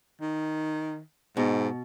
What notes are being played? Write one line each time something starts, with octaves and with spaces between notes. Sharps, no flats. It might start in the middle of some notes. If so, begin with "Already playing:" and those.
D#3
G#2 B2